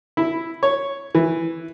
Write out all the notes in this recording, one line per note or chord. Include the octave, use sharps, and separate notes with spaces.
E4
C#5
E3